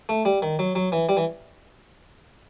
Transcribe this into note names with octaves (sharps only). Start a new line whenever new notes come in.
A3
G3
D#3
F#3
F#3
E3
G3
E3